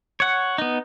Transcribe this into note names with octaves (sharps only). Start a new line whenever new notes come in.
C#5 F#5
B3 D#4